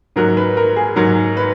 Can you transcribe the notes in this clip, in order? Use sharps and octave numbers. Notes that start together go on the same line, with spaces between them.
G#2 F#3 A#4
B4
A#4
G#4
G#2 F#3 A#4
B4